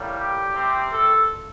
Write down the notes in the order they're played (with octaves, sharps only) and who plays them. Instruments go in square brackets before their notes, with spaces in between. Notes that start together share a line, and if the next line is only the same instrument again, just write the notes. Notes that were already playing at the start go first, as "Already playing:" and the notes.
Already playing: [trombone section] A2 G3 A#3
G4
C3 G3 C4
A4